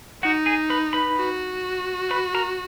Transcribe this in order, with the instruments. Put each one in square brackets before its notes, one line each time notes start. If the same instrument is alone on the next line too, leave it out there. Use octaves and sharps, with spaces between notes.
[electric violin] D#4 [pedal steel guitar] F#4 F#5
[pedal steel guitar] G#4 G#5
B4 B5
B4 B5
[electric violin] F#4
[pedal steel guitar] B4 B5
A#4 A#5